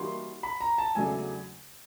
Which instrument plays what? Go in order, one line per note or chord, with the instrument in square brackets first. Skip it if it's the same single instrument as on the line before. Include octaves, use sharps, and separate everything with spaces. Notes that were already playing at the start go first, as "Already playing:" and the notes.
Already playing: [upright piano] E3 G3 A#3 D#4 F#4 [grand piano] C6
[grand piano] B5
A#5
A5
[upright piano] E2 C#3 F#3 A3 D4 [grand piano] G#5